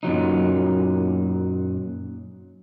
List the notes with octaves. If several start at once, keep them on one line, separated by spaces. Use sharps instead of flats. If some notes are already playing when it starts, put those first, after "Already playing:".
F#2 A#2 F#3 D#4